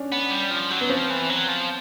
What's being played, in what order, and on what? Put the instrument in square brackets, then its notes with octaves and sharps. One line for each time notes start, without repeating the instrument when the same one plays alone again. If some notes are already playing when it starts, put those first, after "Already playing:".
Already playing: [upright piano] C#4 D4
[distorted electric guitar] B3
G3
F3
F#3
[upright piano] B3
[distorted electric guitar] F3 [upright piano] C4
[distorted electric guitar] E3
F#3
F3